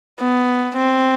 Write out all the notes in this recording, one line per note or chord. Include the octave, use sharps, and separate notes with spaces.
B3
C4